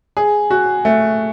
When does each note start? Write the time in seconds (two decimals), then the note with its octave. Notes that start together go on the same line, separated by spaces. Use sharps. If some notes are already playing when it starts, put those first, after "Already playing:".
0.17 G#4
0.50 F#4
0.85 A3